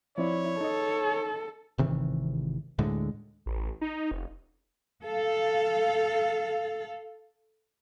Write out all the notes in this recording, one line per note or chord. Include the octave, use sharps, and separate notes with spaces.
F3 C4 E4 C#5 D5
D#4 A4 D#5
G#1 C3 D#3 E3
D2 A2 D3 G#3
A1
D#4
F1
A4 F5